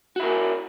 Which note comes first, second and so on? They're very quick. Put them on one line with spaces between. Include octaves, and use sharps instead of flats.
F#4 E4 A#4